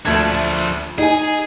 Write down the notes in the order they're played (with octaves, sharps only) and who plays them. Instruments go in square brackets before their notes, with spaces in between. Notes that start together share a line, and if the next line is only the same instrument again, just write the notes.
[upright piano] D2 A3 G#6 [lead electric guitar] F3 D4
[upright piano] D#4 G#5 [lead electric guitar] G#4